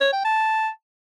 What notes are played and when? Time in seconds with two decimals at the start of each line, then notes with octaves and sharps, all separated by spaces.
0.01 C#5
0.13 G5
0.24 A5